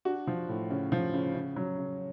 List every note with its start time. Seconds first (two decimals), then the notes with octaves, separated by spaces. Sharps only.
0.05 D4 F#4
0.27 F3
0.49 A2
0.70 C#3
0.92 F3
1.14 C#3
1.35 C#3
1.56 F#3
1.78 C#3